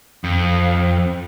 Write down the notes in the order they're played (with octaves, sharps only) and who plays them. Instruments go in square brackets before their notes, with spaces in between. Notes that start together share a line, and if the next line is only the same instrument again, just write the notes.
[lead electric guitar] F2